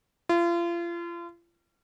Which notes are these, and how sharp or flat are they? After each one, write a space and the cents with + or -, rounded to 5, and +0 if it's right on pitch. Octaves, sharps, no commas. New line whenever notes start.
F4 -35